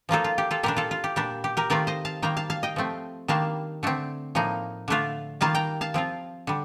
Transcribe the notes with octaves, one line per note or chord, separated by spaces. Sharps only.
F3 A#3 D#4 F4 A4
F4
G4
F4 A4
A#2 G3 D4 G4 A#4
F4 A4
F4
G4
A#2 G3 D4 G4
G4
G4 A#4
D#3 A3 C4 F4 A#4 D5
C5 D#5
F5 A5
D#3 G3 A#3 G5 A#5
F5 A5
F5 A5
D#5 G5
F3 A3 C4
D#3 G3 A#3 D4 F5 A5
D3 A3 C4
A2 F3 A#3 D#4
D3 A3 D4 F4
D#3 G3 A#3 F4 F5 A5
G5 A#5
F5 A5
F3 C4 F4
D3 G3